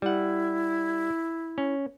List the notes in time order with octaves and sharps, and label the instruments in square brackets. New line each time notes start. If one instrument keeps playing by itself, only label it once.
[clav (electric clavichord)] G3 F#5 [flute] E4
[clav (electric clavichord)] C#4